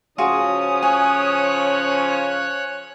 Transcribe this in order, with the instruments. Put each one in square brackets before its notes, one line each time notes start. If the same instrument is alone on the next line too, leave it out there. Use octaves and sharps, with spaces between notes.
[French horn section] C#3 F3 C#4 [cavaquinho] F4 F#4 G#4 [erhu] D#6
[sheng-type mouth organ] C#5 F#6 [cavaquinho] G#5